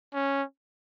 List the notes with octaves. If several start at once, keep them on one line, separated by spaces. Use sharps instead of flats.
C#4